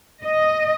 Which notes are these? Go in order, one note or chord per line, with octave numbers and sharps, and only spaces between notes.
D#5